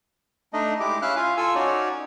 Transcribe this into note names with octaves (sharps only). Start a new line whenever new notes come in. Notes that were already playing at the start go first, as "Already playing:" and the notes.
A3 D4 D#4 D#5
G#3 E4 G4 D6
C#4 E4 E5 F5 F6 F#6
F4 F5 G#5
F4 A4 G#5 E6
C#4 D#4 F#4 C#5 D5